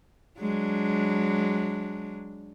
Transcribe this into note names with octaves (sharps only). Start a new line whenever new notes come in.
F#3 G#3 D4